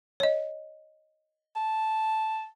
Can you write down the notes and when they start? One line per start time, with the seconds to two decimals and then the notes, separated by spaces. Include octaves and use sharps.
0.20 C#5 D#5
1.56 A5